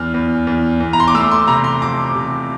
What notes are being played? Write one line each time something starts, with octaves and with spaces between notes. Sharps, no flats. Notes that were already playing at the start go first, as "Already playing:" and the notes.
Already playing: E2 F6
E2
E2
E2
A#5
C6
D6
A3 E6
C6
C3 A#5
C6
F2 D6
C3